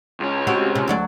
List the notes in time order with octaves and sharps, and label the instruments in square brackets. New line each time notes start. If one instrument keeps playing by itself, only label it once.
[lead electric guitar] C#2 C#4
[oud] C4 F#4 G4
C3
D2 F#3 D5